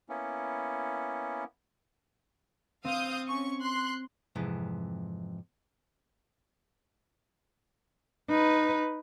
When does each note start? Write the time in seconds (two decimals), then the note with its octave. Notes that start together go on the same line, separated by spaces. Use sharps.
0.09 A#3 B3 C#4 E4
2.85 C4 F5 D#6 G6
3.27 C#4 C#6
3.61 C6 F#6
4.36 F2 G#2 C3 E3
8.30 D#4 B4